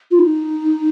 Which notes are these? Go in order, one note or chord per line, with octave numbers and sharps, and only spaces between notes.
F4
D#4